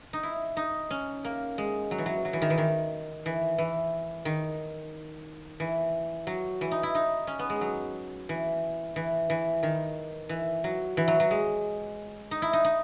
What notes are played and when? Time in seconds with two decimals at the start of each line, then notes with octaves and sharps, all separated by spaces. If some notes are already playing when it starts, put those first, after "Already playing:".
0.13 D#4
0.23 E4
0.57 D#4
0.91 C#4
1.25 A#3
1.58 G#3
1.91 F#3
1.98 E3
2.06 F#3
2.25 F#3
2.33 E3
2.42 D#3
2.50 E3
2.58 D#3
3.26 E3
3.58 E3
4.25 D#3
5.60 E3
6.27 F#3
6.61 E3
6.71 D#4
6.83 E4
6.95 D#4
7.27 C#4
7.39 B3
7.50 G#3
7.61 F#3
8.29 E3
8.96 E3
9.30 E3
9.63 D#3
10.29 E3
10.64 F#3
10.97 E3
11.08 F#3
11.20 F#3
11.31 G#3
12.31 D#4
12.42 E4
12.53 D#4
12.65 D#4